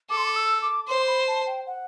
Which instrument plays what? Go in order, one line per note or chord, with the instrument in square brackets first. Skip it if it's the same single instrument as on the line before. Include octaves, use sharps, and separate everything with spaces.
[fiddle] A4 [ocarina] D6
[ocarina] C6
D6
E6
D6
[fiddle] C5 [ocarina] C6
[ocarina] B5
A5
G5
F#5